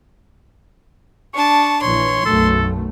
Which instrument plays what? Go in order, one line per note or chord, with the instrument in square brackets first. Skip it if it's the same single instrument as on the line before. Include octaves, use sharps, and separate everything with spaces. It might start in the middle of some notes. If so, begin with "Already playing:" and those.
[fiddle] D4 A5 [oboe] C#6
[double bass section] A#1 E3 [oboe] C#5 [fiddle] C6
[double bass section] B1 F#2 A3 [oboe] A4